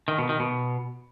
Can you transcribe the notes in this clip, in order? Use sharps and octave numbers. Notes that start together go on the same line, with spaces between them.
D#3
B2
D#3
B2